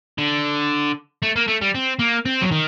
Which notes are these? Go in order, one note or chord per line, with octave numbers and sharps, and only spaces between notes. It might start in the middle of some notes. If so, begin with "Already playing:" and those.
D3
A3
A#3
A3
G3
C4
A#3
C4
F#3
D#3